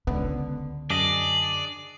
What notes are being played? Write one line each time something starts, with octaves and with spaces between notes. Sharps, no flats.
C#2 D3 B3
F#2 D4 G#4 D5 D#5